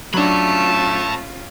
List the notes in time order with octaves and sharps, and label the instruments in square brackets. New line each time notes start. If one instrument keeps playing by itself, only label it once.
[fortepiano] F#3 D4 [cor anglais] A3 [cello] C#4 F4 [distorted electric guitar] A5 B5